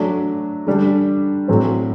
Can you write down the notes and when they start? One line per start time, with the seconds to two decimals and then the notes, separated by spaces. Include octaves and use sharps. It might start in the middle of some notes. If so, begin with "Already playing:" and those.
Already playing: F#3 A3 D4
0.67 D3 G3 D4
1.48 A2 F#3 C4